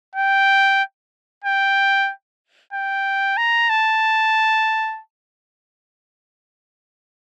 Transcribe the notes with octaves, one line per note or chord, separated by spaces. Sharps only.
G5
G5
G5
A#5
A5